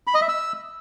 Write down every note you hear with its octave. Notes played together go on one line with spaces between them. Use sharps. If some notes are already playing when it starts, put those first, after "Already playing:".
B5
D#5
E5
E6